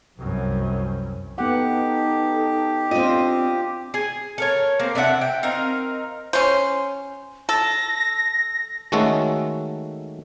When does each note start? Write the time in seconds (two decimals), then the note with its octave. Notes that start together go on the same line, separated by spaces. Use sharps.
0.18 C2 F#2
1.38 B3 D#4 G4 A4 F#5
2.91 C4 D4 F4 D#5
3.94 G#4 G#5
4.38 A4 A#4 C#5
4.80 A#3 C4
4.95 C3 D4 E5 F#5
5.22 G5
5.43 C4 D#4 A#4 F5
6.33 C#4 C5
7.49 A4 A#6
8.92 D#3 G#3 A3 C#4 F#4 A4